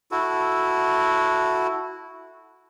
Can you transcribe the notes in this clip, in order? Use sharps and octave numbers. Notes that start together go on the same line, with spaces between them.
E4 F#4 A4